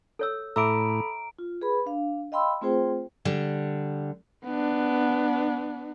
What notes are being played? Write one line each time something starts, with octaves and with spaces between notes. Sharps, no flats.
A4 C#5 E6
A2 A4 E5 A#5 B5 D6 E6 D7
F4
G#4 B4 B5
D4 F5
D#5 F5 G5 B5 C6 E6
A3 C4 F4 G#4 C5 G5
D3 G3
B3 D4